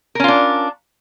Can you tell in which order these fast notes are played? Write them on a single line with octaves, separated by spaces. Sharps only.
A#4 C#4 F4 D4